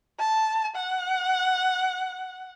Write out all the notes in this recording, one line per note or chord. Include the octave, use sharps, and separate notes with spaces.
A5
F#5